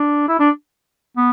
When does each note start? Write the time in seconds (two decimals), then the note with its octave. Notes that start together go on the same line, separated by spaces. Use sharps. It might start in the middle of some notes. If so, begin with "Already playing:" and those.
Already playing: D4
0.29 E4
0.39 D4
1.17 B3